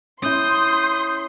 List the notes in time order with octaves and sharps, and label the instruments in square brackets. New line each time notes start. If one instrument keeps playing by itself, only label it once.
[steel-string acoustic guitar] C#4 E4 [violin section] C6 [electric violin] D#6 G6